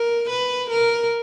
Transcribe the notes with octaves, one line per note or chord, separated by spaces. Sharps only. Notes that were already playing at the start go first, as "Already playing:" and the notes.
Already playing: A#4
B4
A#4